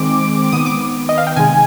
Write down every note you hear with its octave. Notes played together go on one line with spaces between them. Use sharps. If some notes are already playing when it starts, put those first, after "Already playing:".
Already playing: D#3 G#3 C4 D6
D#3 B3 D#6
D6
D#5
F5
G5
C3 D#3 G#3 G#5